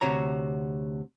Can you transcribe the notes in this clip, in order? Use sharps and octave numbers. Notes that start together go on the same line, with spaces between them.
D2 C3 F#4 C#5 A#5